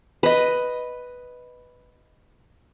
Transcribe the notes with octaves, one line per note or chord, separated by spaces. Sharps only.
B4 D#5